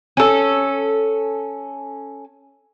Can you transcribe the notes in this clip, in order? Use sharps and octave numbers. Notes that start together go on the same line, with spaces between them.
C#4 A4